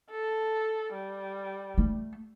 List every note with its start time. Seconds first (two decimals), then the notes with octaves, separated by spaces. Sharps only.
0.10 A4
0.93 G3
1.78 A3